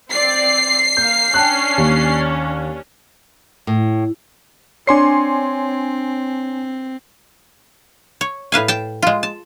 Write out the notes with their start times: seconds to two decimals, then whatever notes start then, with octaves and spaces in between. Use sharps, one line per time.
0.11 C4 D5 C7
0.97 A#3 F5 G6
1.34 C#4 D4 G5 A5 F#6
1.78 D#2
3.67 A2
4.87 C4 D4 C#5 G#5 C6 C7
8.21 C#5
8.52 A2 B4 F5 G#5
8.68 G5 A5
9.02 G#3 F4
9.23 A5